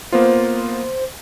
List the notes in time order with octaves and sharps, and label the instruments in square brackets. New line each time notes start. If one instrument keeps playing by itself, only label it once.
[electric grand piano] A#3 B3 F4 [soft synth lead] C5